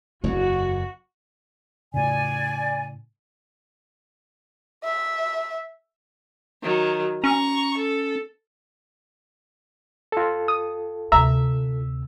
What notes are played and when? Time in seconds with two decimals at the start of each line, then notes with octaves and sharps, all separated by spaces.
0.24 F#1 E2 E4 F#4
1.94 A2 C#3 D5 G#5
4.84 E5
6.62 D#3 F#3
7.24 C#4 A#5 C#6
7.77 A4
10.12 F4 A4
10.48 D#6
11.12 D2 C3 E5 A#5